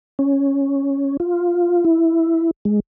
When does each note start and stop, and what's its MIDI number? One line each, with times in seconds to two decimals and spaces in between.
0.19 1.17 61
1.20 1.84 65
1.85 2.51 64
2.65 2.80 56